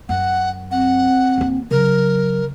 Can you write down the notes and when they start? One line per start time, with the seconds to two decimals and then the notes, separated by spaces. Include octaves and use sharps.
0.09 F#2 F#5
0.71 C4 F#5
1.38 D#2 D4
1.71 C#3 F#3 A#4